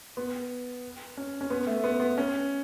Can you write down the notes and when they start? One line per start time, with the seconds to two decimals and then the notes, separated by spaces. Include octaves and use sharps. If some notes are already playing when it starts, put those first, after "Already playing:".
0.17 B3
1.17 C#4
1.41 C#4
1.50 B3
1.67 A3
1.84 B3
2.00 B3
2.18 C#4